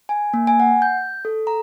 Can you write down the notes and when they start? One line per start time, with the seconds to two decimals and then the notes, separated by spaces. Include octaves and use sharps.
0.09 G#5
0.34 A#3
0.47 G#5
0.60 F#5
0.82 G6
1.25 A4
1.47 A#5